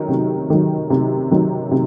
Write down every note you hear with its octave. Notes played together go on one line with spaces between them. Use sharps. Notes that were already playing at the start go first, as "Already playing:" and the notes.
Already playing: D#3 F#3
C3
D#3 F#3
C3
D#3 F#3
C3